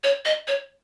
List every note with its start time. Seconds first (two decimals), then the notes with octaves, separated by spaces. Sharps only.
0.04 C#5
0.25 D#5
0.48 C#5